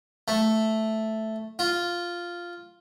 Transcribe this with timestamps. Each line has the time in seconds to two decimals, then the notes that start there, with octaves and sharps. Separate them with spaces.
0.28 A3
1.59 F4